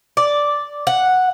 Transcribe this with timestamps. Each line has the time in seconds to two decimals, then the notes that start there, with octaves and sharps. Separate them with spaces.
0.17 D5
0.87 F#5